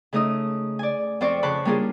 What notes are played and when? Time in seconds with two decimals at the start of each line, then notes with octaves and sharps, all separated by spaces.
0.13 C#3 A3 D#4 D#5 D#6
0.79 D5 G#5
1.21 F2 C4 F4 C5 D5 C#6
1.43 C#3 C5 A5 B5 C#6 F#6
1.65 G3 A#3 C#4 D4 F4 G#4